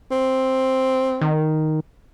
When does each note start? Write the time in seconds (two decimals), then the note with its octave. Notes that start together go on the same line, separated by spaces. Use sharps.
0.11 C4
1.21 D#3